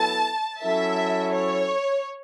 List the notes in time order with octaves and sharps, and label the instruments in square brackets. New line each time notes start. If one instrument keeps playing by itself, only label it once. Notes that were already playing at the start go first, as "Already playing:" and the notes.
Already playing: [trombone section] F#3 B3 E4 A4 [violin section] A5
[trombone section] F#3 C#4 E4 A4 [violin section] E5
[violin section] C#5